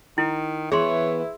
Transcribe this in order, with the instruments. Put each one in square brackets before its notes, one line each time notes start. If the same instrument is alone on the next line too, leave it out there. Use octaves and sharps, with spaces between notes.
[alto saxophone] D#3 [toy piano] E4
[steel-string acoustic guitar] E3 B3 [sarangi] E4 [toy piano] G#4 C6 [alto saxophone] C#5